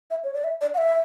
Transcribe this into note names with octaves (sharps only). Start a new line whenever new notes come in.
E5
C#5
D5
E5
D5
F#5
E5